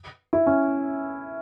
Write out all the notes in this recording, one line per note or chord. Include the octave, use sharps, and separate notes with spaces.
E4
C#4